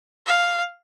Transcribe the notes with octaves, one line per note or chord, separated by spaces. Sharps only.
F5